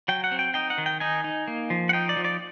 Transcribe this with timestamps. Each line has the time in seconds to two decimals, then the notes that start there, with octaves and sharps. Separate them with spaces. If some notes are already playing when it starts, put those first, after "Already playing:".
0.08 F#3 G5
0.24 F#5
0.32 C4
0.39 G5
0.54 D#4 G5
0.70 F#5
0.78 D#3
0.86 G5
1.00 D#4 G#5
1.24 D#4
1.48 A#3
1.70 F3
1.89 F#5
1.93 D#4 G5
2.09 D5
2.17 F3
2.25 D5